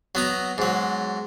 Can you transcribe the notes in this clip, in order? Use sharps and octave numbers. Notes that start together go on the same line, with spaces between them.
F#3 B3 A#5
G#2 F#3